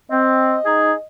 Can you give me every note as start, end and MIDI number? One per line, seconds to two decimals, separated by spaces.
0.11 0.56 60
0.11 1.07 75
0.65 0.91 63
0.65 0.91 68